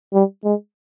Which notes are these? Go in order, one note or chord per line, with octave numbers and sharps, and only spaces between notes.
G3
G#3